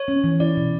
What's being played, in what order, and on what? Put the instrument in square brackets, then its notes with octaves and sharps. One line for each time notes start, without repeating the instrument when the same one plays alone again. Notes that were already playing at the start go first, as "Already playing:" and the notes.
Already playing: [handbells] C#5
[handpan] C#4
E3
[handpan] E4 [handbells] D5
[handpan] B2